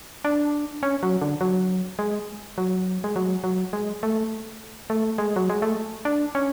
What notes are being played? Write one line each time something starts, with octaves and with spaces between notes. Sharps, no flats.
D4
C#4
F#3
D3
F#3
G#3
F#3
G#3
F#3
F#3
G#3
A3
A3
G#3
F#3
G#3
A3
D4
C#4